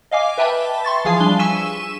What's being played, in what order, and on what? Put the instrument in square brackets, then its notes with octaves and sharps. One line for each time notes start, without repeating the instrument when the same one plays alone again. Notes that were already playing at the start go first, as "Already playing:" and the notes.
[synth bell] D#5 F5 G#5 D6
B4 E5 G5 A5 B5
C6 C#6 A6
E3 F3 G#4 F5 G#5 D#6
G3 D4 G7
G#5 C#6 E6 B6 D#7 E7